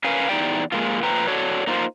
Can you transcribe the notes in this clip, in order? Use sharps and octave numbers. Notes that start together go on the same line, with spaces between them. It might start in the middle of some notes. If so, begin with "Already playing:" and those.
C#4 A#4 B4 F5 G#5
E2 A#3 D#4 G4 D5 G5
A#2 C#3 G#3 A#3 F4
A#2 F3 A3 B4 G5 A#5
F#4 A4 C#5 D5
A#3 D#4 F4 B4 C5